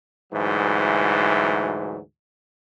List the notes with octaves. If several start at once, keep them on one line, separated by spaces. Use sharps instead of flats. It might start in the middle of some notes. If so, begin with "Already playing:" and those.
D2 G#2 E3 F#3